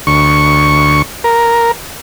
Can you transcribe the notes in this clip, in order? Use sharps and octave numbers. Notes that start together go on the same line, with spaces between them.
D2 C#6
A#4